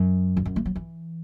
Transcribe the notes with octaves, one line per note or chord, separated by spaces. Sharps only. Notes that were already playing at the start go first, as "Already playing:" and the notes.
Already playing: F#2
E2
F#2
A3
F#3
E3